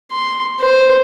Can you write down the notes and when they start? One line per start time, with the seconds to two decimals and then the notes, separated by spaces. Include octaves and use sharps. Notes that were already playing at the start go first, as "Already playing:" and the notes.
0.12 C6
0.60 C5